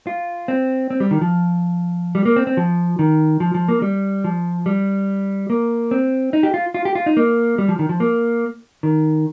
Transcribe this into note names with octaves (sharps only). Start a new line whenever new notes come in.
F4
C4
C4
G3
D#3
F3
G3
A#3
C4
C4
F3
D#3
F3
F3
A#3
G3
F3
G3
A#3
C4
D#4
G4
F4
F4
G4
F4
D#4
A#3
G3
F3
D#3
F3
A#3
D#3